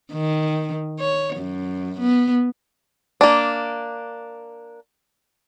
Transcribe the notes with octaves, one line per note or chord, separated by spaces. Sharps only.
D#3
C#5
F#2
B3
A#3 D4